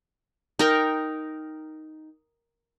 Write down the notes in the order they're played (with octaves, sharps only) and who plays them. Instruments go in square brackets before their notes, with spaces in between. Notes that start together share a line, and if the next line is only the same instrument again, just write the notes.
[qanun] D#4 A#4 G5